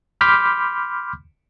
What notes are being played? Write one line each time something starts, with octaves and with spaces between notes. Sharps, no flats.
B5 C6 D6 F6 G6 B6